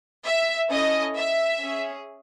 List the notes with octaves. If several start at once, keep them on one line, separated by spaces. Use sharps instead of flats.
E5
C#4 E4 A4 D#5
E5
C#4 G#4